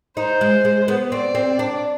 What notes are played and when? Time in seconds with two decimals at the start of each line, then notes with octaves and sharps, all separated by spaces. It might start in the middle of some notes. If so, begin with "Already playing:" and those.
0.17 D#4 C5
0.41 G#3
0.65 G#3
0.88 B3
1.12 C4 D5
1.35 C4
1.59 D4